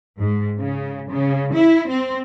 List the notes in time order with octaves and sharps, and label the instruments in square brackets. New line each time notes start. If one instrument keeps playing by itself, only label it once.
[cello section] G#2
C#3
C#3
E4
C4